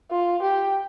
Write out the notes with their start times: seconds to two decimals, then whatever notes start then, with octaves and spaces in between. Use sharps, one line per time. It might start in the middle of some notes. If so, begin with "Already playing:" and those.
0.11 F4
0.42 G4